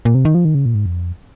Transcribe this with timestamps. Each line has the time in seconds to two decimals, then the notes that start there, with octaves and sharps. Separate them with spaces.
0.05 A#2
0.15 C3
0.25 D#3
0.35 F3
0.45 D#3
0.55 C#3
0.66 A#2
0.75 G#2
0.86 F2